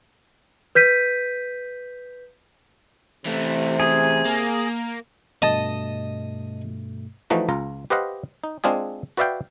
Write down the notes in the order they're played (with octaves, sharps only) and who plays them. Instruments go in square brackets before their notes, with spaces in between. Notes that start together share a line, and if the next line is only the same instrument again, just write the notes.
[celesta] B4 G6 B6 D#7
[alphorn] C3 [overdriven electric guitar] E3 A3
[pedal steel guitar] G#4
[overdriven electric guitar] A#3
[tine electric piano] G2 B2 A3 [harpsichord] D#5 A5
[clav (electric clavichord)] E3 F3 A3 D#4 F#4
C#2 F4 A#5
G4 B4 C5 D#5 F5 F#5
D#4
G#3 C4 D4 F4 G#4
F#4 B4 D5 E5 F5 G5